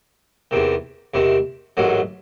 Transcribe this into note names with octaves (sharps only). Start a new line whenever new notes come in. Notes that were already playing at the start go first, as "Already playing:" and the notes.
E2 C3 D#3
E2 C3 D#3
A1 G#2 D#3 F#3